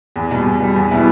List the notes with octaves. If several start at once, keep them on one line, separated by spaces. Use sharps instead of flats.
E2
B2 G3
E2
B2 G3
E2
B2 G3 B3 E4